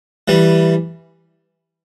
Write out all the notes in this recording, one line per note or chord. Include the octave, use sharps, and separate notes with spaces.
E3 G3